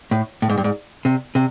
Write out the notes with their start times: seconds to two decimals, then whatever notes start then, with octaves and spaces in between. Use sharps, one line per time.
0.11 A2
0.42 A2
0.50 G#2
0.58 G2
0.64 G#2
1.05 C3
1.35 C3